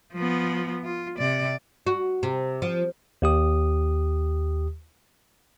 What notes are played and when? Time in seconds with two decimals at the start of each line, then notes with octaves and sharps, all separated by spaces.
0.14 F3 B3
0.84 F4
1.18 C3 D5
1.86 F#4
2.23 C3
2.62 F3
3.22 D#2 G4 D#6